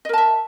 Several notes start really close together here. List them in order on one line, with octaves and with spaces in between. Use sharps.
D#5 A#4 A5 E5